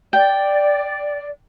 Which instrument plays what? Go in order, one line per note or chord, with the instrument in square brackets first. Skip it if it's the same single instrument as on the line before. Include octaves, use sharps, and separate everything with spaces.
[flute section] D5 [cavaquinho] G5